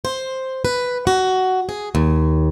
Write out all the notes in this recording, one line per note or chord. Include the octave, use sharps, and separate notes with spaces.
C5
B4
F#4
G#4
D#2